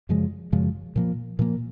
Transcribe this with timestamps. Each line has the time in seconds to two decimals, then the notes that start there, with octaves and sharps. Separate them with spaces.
0.09 F#2 C#3 F3 G#3
0.52 F#2 C#3 F3 G#3
0.96 A#2 F3 A#3
1.39 A#2 F3 A#3